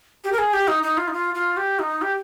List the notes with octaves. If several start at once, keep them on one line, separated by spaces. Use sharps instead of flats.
G4
A#4
G#4
G4
D#4
D#4
F4
D#4
F4
F4
G4
D#4
G4